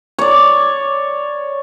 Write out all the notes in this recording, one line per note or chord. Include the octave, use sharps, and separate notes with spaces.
C#5 D5